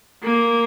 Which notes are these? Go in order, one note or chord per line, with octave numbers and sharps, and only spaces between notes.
A#3